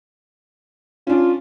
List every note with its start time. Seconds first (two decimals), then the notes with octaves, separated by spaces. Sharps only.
1.07 C#4 D4 F4